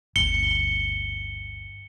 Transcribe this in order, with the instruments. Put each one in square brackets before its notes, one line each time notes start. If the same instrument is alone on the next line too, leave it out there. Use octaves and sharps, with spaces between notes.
[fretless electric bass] G1 D2 [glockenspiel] C#7 G7